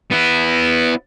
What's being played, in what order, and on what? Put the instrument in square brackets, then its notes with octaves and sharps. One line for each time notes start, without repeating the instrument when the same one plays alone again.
[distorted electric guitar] B3 E4